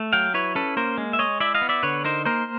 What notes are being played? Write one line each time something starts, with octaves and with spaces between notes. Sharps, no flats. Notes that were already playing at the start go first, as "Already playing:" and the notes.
Already playing: A3
F#3 F5 G5
E4 B4 C#5
C#4 A4 B4
A#3 A#4 C5
G#3
E5
G#3 C#5 D#5
E4 D5 E5
D#5 F5
B3
D5 E5
D3 B4 C#5
D#4 A#4 C5
A#3 A#4 C5